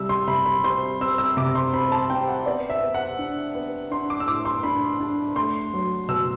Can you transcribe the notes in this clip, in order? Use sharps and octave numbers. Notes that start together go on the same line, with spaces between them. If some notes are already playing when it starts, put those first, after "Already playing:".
Already playing: C3 G3 E6
C6
C3 B5
B5
C4 C6
C4 E6
E6
C3 D6
C6
C4 B5
A5
C4 G5
F#5
B3 D5
E5
B3
F#5
D4
B3
D4 C6
D6
E6
A2 D6
C6
D4 B5
D4
A3 C6
F#3
B2 E6